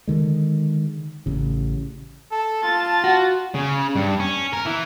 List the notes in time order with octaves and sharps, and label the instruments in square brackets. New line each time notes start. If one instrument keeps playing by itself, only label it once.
[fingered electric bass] D3 D#3 G#3
A1 C#3
[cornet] A4 [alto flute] A5
[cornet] F4 [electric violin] A6
[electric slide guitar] F#4
[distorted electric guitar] C#3
G2
C#4
A#4
E3